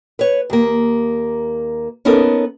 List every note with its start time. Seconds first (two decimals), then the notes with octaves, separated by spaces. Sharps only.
0.19 B4 C#5
0.50 D#2 A#3
2.05 B3 C#4 D#4 A4 A#4